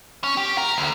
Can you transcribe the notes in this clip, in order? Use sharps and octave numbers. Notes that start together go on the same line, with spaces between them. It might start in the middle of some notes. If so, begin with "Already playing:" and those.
C#4
G4
A#4
D2